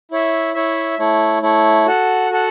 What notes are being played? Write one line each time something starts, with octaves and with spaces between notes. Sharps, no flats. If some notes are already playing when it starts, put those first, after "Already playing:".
E4 C#5 E5
E4 C#5 E5
A3 E4 C#5
A3 E4 C#5
F#4 A4 F#5
F#4 A4 F#5